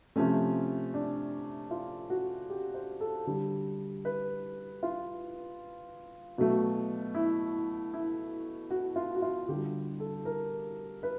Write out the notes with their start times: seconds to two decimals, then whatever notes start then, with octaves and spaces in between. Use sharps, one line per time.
0.16 C3 F3 A3 C#4
0.94 D4
1.71 F4
2.10 F#4
2.50 G4
2.74 C5
3.00 A4
3.27 D3 G3
4.05 B4
4.83 F4
6.38 B2 F#3 A3
7.15 E4
7.93 E4
8.71 F#4
8.96 F4
9.15 F#4
9.22 F4
9.48 D3 G3 G4
10.00 A4
10.25 A#4
11.03 B4